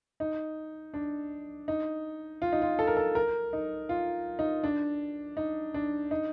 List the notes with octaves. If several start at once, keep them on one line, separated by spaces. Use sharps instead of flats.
D#4
D4
D#4
F4
D#4
F4
A4
A#4
A4
A#4
D#4
F4
D#4
D4
D#4
D4
D#4